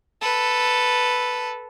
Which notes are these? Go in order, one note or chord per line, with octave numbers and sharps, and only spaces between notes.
A4 B4